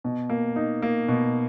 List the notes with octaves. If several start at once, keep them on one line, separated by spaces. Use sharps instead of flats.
B2
A#3
D#4
A#3
B2